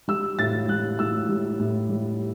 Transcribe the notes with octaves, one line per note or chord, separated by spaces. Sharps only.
G3 E6
A2 A6
G3 F#6
A2 E6
G3
A2
G3